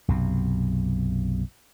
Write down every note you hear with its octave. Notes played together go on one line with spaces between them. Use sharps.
B1 F#2 C3